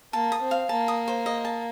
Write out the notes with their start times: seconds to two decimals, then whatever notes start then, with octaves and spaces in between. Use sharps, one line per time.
0.13 A#3 A5
0.32 D#6
0.41 C4
0.51 F5
0.69 A#3 A5
0.88 D#6
1.08 C5
1.26 D#5
1.45 A5